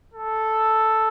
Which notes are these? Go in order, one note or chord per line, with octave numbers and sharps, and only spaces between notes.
A4